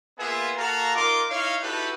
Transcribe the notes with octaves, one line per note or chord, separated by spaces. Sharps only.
A#3 B3 F4 G#4 E5 G#5
A#3 F#4 A4 F5 A#5
D#4 F4 A#4 C6 D6
D#4 E4 C#5 F5
D#4 E4 F#4 G4 A4 B4